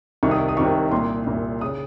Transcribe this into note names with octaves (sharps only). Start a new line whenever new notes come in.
C2 C3 D#3 C#6
D#6
D#6
C2 C3 D#3 C#6
C2 A#2 C6
C2 A#2
C#3 D#6